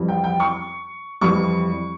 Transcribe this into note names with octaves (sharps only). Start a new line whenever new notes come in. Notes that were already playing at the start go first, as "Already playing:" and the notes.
Already playing: F2 E3 G3
G5
G5
C#6
F2 E3 G3 C#6